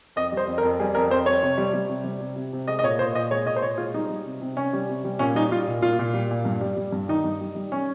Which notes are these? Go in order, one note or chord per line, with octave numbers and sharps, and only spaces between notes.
F2 D#5
G3
C5
F2
A#4
F2
G3 G#4
F2 A#4
F2 C5
F2 C#5
C3
G3
G3
C3
G3
C3
C3
C3
G#3 D#5
D#5
A#2 C#5
A#2 C5
A#2 D#5
G#3 C#5
A#2 D#5
C5
A#2 C#5
G#3 F4
G3 D#4
G3
C3
C3
C3 C#4
G3
C3
G3
A#2 C#4
G3 D#4
G3 F4
A#2
A#2 F4
A#2
G3
A#2
G2
G3
G3
G2
D#3 D#4
G2
G3
G3
G3 C#4